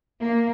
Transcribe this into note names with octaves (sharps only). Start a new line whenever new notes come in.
A#3